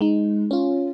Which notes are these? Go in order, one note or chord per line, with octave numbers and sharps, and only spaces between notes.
G#3 D#4
C#4 F4